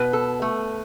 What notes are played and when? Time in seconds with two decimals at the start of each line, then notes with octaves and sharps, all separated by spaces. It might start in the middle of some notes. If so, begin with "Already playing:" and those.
Already playing: B2 B4
0.13 A4
0.42 A3